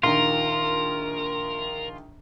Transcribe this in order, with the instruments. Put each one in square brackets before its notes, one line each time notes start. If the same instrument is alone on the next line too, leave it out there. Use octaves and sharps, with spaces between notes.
[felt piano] A#1 D#3 [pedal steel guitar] F4 [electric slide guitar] A#4